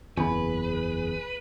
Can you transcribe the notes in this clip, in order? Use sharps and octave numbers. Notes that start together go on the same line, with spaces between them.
F#1 E2 G#4 B4 G#5 B5